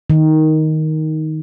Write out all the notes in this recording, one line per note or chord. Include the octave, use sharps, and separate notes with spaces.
D#3